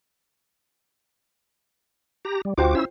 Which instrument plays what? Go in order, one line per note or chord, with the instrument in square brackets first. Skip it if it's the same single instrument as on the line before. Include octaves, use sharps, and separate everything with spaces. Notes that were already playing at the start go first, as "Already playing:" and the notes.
[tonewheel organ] G4 A#5
G3
[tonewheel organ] D2 F#4 D6 [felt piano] F4 C5 G5
[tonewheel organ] C#4 E4 E6